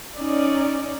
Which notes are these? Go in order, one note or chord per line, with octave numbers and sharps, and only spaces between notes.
C#4 D#4 D5